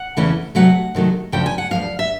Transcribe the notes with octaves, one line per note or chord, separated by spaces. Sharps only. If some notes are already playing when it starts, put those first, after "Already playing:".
Already playing: F#5
E2 C#3 E3 A3 C#4
C3 D#3 F#3 A3 F#5
C3 D#3 F#3 A3
D2 C#3 F3 G5
G#5
F#5
D2 C#3 F3 F5
E5